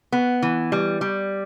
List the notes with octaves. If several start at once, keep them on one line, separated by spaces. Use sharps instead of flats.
B3
E3
G3
G3